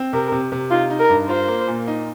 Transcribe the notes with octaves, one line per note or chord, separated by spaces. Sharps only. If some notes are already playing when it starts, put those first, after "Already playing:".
Already playing: C4
C3 A#4
C3
C3
D#4 F4
D#4
A#4
G2
F4 C5
A#3
A#2
D#4